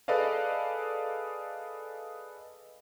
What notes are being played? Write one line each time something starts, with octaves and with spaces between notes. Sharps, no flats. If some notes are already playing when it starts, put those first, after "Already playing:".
G#4 A4 B4 D5 D#5 F5